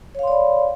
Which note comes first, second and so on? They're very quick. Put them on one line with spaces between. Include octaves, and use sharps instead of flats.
C#5 F5 C6 D5 B5